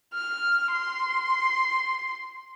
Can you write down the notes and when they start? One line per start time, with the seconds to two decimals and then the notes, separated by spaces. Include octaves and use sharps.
0.14 F6
0.72 C6